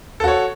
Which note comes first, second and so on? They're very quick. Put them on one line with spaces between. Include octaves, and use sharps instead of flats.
A4 F#4 C#5